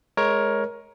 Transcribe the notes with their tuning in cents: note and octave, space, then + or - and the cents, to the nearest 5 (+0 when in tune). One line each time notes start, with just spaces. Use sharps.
G#3 +20 A#4 +15 C#5 +0